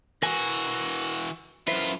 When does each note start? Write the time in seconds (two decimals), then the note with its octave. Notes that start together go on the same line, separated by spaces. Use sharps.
0.22 E3 F#4 A#4 G#5
1.68 F#2 E4 F4 B4 C5